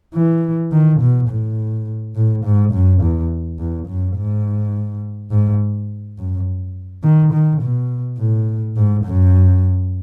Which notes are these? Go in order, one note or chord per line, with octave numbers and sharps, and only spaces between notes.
E3
D#3
B2
A2
A2
G#2
F#2
E2
E2
F#2
G#2
G#2
F#2
D#3
D#3
B2
A2
G#2
F#2